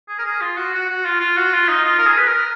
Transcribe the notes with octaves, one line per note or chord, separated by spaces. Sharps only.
G#4
A#4
G#4
F4
F#4
F#4
F#4
F4
F4
F#4
F4
D#4
F4
A#4
G#4
B4
A#4